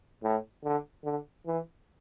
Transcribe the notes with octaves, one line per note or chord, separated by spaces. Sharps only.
A2
D3
D3
E3